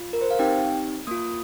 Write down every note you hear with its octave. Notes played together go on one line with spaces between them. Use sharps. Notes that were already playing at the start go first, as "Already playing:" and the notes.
Already playing: F4
A#4
C5
F5
C4 D#4 G4 G5
A#3 F4 D#6